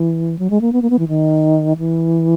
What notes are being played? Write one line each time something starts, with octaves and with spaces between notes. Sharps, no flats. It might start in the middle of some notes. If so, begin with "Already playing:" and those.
Already playing: E3
F#3
G#3
A#3
B3
A#3
B3
E3
D#3
E3